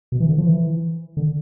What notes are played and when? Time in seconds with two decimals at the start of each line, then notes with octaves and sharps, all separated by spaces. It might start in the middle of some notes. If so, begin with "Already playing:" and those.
0.12 B2
0.20 E3
0.29 D3
0.38 F3
0.46 E3
1.17 D3